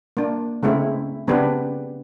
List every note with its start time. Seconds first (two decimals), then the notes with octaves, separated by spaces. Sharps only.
0.17 A#3 D4
0.63 C#3 G#3 A3 C4 E4
1.27 C#3 B3 C4 D4 G4 B4